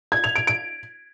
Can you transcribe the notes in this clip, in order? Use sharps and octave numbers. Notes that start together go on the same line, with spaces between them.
G#6
F7
D7
D7